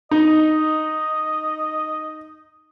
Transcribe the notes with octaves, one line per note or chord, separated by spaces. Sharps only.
D#4 D#5